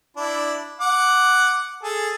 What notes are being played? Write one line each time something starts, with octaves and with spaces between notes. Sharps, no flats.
D4 E4
F#5 D6
G#4 A4